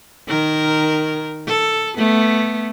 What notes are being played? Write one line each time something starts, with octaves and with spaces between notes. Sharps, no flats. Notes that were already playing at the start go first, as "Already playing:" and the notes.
D#3 A#4
A4
A3 B3